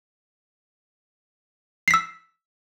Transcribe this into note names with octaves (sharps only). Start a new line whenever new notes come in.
E6 B6 C7